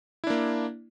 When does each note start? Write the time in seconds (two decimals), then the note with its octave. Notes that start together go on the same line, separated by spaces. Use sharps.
0.24 E4
0.27 D4
0.30 A#3